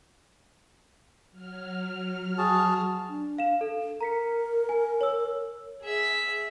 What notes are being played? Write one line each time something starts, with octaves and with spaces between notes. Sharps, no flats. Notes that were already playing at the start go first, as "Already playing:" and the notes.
F#3 F6
F#4 G#4 A5
D4
F5 E7
A4
A#4 A#5 B6 C#7
G#5
C#5 E6
G#4 E5